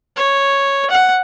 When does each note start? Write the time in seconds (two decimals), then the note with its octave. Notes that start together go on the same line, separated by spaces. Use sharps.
0.16 C#5
0.90 F#5